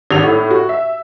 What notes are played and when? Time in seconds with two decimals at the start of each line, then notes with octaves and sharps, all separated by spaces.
0.11 G#1 F7
0.24 A2
0.51 F#4
0.69 E5